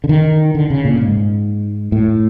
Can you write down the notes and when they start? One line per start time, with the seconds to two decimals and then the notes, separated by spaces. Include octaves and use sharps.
0.04 D3
0.09 D#3
0.55 D3
0.70 C#3
0.85 A#2
1.01 G#2
1.92 A2